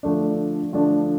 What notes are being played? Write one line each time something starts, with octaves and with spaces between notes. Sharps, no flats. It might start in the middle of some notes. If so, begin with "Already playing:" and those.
D3 F3 A3 D4
D3 F3 A3 D4